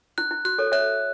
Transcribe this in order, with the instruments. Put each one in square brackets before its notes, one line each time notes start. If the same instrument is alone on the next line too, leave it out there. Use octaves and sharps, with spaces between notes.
[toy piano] E4 [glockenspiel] F#6
[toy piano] E4
[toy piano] F#4 [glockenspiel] F#6
[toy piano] A4 C#5
[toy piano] C#5 E5 [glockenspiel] F#6